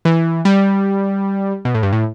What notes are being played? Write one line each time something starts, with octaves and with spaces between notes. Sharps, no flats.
E3
G3
B2
A2
G2
A2